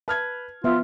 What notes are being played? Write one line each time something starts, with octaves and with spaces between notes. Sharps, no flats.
B4 A5 F6 G#6
F3 B3 F4 E5